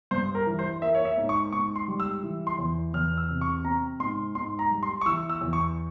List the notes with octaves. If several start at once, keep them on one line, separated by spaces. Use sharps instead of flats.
G2 C5
A#4
E3
C5
A#3 E5
C#5
E5
G#2
C#6
G#2 C#6
C6
G3
E6
E3
C6
E2
E2 F6
E6
C3
C#6
C4 A#5
G#2 C6
G#2 C6
A#5
G3
C6
C#6
E3 E6
E6
E2
C#6